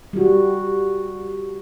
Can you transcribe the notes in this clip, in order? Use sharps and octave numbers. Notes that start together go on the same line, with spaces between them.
G3 F#4